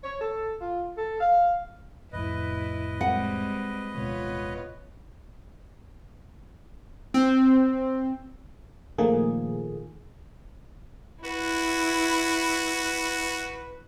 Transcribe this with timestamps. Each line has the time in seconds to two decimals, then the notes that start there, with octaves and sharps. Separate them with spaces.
0.04 C#5
0.21 A4
0.61 F4
0.98 A4
1.20 F5
2.13 F1 F2 A2 E4 B4 D#5
3.01 G3 G#3 C4 F#5
3.95 D1 B2 G#3 B3 F4 C#5
7.14 C4
8.98 A#2 D#3 F3 A3 A#3 G#4
11.24 E4 F#4 B4